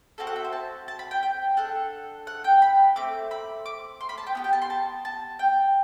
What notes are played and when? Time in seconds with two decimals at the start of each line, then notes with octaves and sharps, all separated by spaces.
0.18 C4 F#4 A4 A5
0.27 F#5
0.36 E5
0.44 C5
0.53 A5
0.88 A5
0.99 B5
1.11 G5
1.23 G5
1.57 D4 A4 F#5
2.27 F#5
2.44 G5
2.62 B5
2.96 A3 C4 D6
3.31 B5
3.66 D6
4.01 C6
4.09 B5
4.18 A5
4.27 G5
4.35 B3 E4 G4
4.44 G5
4.53 A5
4.62 C6
4.70 A5
5.05 A5
5.39 G5